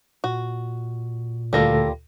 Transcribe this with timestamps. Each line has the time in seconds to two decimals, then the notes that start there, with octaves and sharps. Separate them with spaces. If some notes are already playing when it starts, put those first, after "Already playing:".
0.24 A#2 F#4
1.53 D2 G3 A#3 F4 A4 A#6